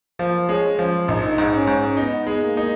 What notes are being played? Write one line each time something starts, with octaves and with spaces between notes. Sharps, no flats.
F3 A#3
G#3 C#4
F3 C#4
A#1 D#4
G#2
C#4
G#2
B3 D#4
G#3
A#3
D#4